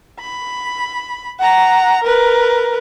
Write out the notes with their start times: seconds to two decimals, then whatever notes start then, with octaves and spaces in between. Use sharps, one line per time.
0.21 B5
1.40 F#5 A#5
2.04 A#4 B4